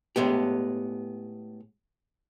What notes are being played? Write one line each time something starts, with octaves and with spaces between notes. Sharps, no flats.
A2 G#3 B3 G4